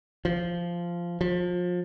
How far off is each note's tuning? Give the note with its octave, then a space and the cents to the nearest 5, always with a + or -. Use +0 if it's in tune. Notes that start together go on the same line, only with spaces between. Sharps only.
F3 -10
F3 +30